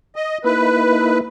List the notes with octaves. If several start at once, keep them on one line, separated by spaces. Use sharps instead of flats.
D#5
A#3 D#4 E4 B4